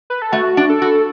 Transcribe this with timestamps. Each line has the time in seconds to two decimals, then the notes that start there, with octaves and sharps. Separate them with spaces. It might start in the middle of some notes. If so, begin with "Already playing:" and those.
0.10 B4
0.22 A4
0.32 A3 F#4
0.57 D4
0.69 A4
0.82 F#4